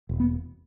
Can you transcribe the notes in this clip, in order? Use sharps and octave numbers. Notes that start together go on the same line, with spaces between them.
E1
B3